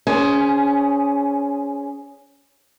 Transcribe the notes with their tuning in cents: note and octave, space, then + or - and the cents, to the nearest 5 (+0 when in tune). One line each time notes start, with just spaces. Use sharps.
C#4 +25 G#4 +0 C5 +5